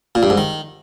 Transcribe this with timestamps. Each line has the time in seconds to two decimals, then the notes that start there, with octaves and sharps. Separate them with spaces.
0.15 A#2
0.23 G2
0.30 G#2
0.38 D#3